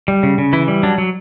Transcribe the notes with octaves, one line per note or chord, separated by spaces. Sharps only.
G3
C#3
C#3
E3 E4
G3
F#3 D4
F#3